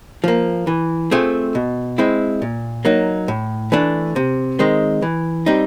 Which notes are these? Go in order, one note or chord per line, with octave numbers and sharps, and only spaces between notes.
F3 A#3
E3
A3 C4 F4 G#4
B2
G#3 C4 E4
A#2
F#3 A#3 D#4
A2
E3 A3 D4
C3
D#3 G#3 C4
E3
G3 C4 D#4